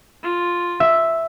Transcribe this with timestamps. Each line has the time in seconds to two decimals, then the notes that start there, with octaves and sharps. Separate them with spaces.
0.23 F4
0.80 E5